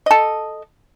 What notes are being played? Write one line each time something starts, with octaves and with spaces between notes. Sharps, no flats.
A4 D#5